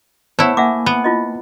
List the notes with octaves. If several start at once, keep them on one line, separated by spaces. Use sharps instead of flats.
A3 B3 E4 C5 C#5 F#5
A#3 E5 F#5 G#5 D6
B3
E4 F4 D#5